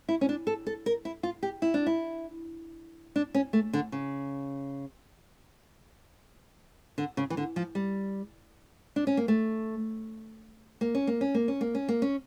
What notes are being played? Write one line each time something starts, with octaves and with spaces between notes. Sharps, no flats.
E4
C#4
D4
A4
A4
A#4
E4
F4
G4
E4
D4
E4
D4
C#4
A3
D3
C#3
D3
C#3
E3
D3
F3
G3
D4
C#4
A#3
A3
A#3
C#4
A#3
C#4
A#3
C#4
A#3
C#4
A#3
C#4